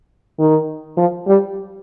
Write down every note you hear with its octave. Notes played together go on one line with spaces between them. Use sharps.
D#3
F3
G3